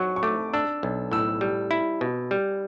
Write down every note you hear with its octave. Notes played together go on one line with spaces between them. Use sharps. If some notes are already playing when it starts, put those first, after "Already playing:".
Already playing: F#3 C#6
C#6
A3 D6
D4 E6
B1
A2 E6
G3
E4
B2
G3